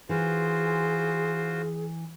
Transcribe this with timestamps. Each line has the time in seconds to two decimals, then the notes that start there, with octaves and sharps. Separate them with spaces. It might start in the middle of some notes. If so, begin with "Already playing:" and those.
0.09 E3 F4 F#4 G#4 C5